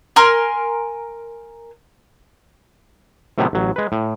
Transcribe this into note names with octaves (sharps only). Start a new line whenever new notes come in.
A#4 G#5 C6 F6
A2 C3 D#3 F#3 A3 B3
A1 F#3
G#3 B4
A2